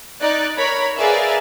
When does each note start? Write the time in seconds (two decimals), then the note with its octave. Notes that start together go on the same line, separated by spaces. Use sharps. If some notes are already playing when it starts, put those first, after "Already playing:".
0.20 D#4 D5 F#6
0.57 A#4 C#5 A#5 B5
0.97 G#4 A#4 B4 D5 E5 F5